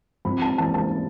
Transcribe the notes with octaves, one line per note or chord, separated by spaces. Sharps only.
F2 B5
A5
E3 A5
A5